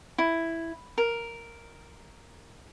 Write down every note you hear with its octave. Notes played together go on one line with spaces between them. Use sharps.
E4
A#4